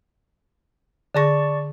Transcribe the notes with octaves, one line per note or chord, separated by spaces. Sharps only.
D3 G#4 D5 A5 C#6 A#6